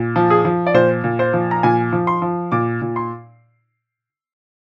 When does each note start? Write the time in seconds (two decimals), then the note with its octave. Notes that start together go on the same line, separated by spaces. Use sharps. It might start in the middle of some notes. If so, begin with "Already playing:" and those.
Already playing: A#2
0.16 F3
0.30 G#4
0.45 F3
0.67 D5
0.74 A#2 C5
1.04 A#2
1.19 C5
1.33 F3
1.51 A#5
1.63 A#2 G#5
1.92 F3
2.07 C6
2.22 F3
2.52 A#2 D6
2.82 A#2
2.96 C6